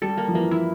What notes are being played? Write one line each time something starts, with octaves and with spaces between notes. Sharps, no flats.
G3 A4
A#3
F3
E3 A#3
E4